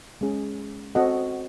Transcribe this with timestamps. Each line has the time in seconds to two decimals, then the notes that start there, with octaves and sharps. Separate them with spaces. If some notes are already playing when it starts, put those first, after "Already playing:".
0.21 G#3 C#4 G#4
0.95 C4 F#4 A4 D#5 F#5